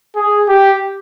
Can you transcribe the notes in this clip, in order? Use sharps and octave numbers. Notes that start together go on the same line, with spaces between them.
G#4
G4